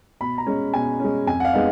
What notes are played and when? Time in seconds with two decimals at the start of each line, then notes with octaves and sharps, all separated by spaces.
0.21 B2 B5
0.38 A#5
0.47 G#3 C#4
0.74 B2 G#5
1.00 G#3 C#4
1.27 F2 G#5
1.40 F#5
1.45 F5
1.53 G#3 B3 D#4